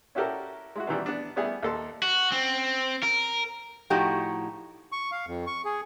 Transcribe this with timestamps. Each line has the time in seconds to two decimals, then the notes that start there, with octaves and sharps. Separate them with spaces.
0.15 C#4 E4 F#4 G4 A4 A#4
0.76 G#3 E4 F#4
0.87 B2 D#3 E3 G3
1.06 B3 D4
1.36 G3 A3 B3 E4 G#4
1.63 D#2 A4 C6
2.02 F#4
2.32 C4
3.03 A#4
3.90 A2 F3 D#4 F#4 G4 A#5
4.92 C#6
5.12 F5
5.27 F2
5.47 C#6
5.65 G#4